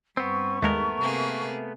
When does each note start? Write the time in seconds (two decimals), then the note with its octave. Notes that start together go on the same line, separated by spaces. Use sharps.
0.17 G2 B3 C4 C#6
0.62 D#2 G#3 A3 B3 A#4
0.99 C3 A#3 G#4